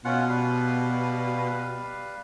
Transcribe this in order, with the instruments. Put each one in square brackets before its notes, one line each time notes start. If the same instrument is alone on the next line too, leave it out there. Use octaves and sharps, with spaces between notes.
[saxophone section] B2 [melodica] C#4 F4 F#5
[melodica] G3 B4 F5